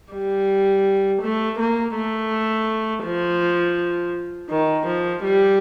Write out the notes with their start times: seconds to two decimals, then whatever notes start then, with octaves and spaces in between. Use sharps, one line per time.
0.12 G3
1.22 A3
1.59 A#3
1.95 A3
3.05 F3
4.50 D#3
4.86 F3
5.23 G3